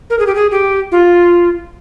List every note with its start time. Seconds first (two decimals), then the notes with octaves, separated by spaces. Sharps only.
0.10 A#4
0.19 G#4
0.27 G4
0.35 G#4
0.51 G4
0.92 F4